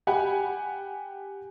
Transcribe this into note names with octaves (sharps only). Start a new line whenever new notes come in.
G4 F#5 G#5 B5